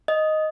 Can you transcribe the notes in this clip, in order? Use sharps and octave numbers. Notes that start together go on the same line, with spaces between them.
D#5